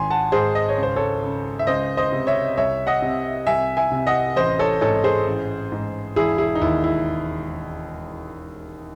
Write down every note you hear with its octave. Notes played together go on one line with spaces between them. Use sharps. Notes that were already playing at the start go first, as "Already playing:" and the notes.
Already playing: G#1 G#5 C6
F#5 A5
G#2 G#4 C5
D#5
C#5
C#2
C5
A4 C#5
C#3
E5
C#2 C5 D#5
C5 D#5
C3
C#5 E5
C2 C#5 E5
D#5 F#5
C3
C2 E5 G#5
E5 G#5
C3
D#5 F#5
A1 C5 D#5
A4 C#5
G#2 A4 C#5
C#5
G#4 C5
A1
G#2
E1 E4 G#4
E4 G#4
D#4
D#2 E4
E4